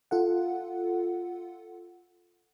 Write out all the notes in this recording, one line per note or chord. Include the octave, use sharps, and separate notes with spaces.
F4 A4 F#5